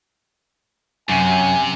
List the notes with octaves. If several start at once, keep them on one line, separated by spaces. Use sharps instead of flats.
F#2 C3 G#5